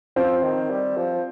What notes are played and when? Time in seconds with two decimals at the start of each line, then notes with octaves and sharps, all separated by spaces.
0.16 F3 C4
0.43 D#3
0.70 G3
0.97 F3